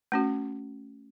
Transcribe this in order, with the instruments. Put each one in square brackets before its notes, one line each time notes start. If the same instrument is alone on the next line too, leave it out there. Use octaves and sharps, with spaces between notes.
[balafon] A3 C#4 F#4